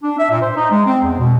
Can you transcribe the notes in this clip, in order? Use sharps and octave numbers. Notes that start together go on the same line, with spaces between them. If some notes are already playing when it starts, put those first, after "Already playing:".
D4
E5
A#2
C5
D#4
G#3
C4
E2
B2